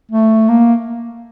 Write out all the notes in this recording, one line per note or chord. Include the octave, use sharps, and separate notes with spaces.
A3
A#3